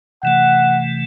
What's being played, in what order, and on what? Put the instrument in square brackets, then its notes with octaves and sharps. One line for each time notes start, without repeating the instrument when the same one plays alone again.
[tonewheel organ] C3 E3 A3 [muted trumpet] F#5